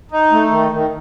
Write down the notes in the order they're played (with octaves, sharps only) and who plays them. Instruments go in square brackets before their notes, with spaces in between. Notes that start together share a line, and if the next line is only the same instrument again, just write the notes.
[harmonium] D#4
A3
D#3
D#3